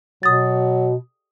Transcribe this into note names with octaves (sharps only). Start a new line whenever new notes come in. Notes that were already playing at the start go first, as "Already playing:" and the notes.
B2 F#3 D#6 A6